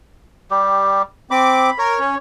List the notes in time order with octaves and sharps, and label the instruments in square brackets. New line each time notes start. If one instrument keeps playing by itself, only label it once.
[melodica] G3 G4
[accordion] C4 D6 [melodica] B5
[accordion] A#4 [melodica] C#5
[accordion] C#4